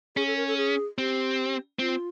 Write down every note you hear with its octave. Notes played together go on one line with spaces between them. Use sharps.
C#4 G#4
A4
A#4
A4
G#4
C4 G4
C4 F4